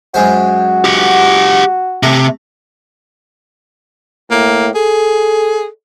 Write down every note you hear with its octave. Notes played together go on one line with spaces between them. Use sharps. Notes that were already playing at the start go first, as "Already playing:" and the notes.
F#2 G#3 F#4 C5
G4 F#5
C3 A3
A2 A#3
G#4 A4